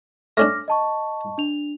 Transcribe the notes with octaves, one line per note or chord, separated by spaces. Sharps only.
A3 C#4 D4 D6 F6 A#6
D#5 A5 C#6
D4 F7